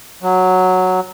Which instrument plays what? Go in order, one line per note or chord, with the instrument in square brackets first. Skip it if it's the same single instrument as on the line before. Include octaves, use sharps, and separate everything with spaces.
[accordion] F#3